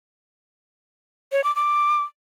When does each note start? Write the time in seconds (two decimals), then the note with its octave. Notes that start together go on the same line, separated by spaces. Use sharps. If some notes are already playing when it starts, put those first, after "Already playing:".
1.32 C#5
1.44 D6
1.56 D6